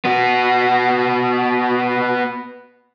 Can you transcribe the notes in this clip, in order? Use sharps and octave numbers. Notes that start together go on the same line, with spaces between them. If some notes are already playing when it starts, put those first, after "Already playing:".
B3 F#4